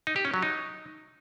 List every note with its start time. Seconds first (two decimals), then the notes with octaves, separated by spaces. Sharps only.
0.07 D#4
0.16 G4
0.25 C#4
0.34 F#3
0.42 D#4